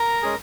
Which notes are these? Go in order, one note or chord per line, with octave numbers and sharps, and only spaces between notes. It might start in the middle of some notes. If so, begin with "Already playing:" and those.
Already playing: A#4 A#5
G#3 C#4 G#4